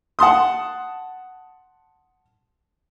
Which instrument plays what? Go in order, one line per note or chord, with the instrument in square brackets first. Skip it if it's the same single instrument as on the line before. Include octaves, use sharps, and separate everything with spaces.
[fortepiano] F#5 A5 C6 D#6